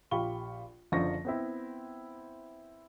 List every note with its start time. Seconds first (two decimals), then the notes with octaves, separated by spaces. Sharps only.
0.11 A#1 F4 G4 B5 C#6 G7
0.92 F#1 D3 F3 C#6 A#6
1.25 B3 C4 E4